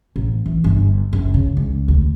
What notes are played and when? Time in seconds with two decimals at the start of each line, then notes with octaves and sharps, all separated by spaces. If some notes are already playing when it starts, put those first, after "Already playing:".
0.16 A1
0.46 E3
0.64 G1
1.13 F#1
1.34 C#3
1.57 C#2
1.88 D2